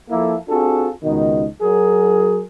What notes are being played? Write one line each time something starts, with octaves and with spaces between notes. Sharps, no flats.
F3 A#3 E4 A4
C4 D4 F4 F#4 G#4 A4
C#2 B2 D#3 D#4
F#3 G#4 A#4